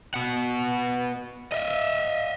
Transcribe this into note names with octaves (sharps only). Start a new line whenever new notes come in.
B2 F#5
D#5 E5